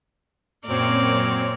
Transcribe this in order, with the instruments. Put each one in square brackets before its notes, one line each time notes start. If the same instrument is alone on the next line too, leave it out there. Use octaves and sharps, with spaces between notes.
[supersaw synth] F#2 C4 C#5 [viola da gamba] A#2 A#4 D5